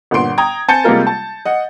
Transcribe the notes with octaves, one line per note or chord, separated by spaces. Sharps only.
G1 A#2 B3 C6 D7
G5 A#5 D#6 G#6
C4 G#5 A5 G6 A6 C#7
C3 G3 G#3 A#3 F4 A#4
A5
D#5 F#5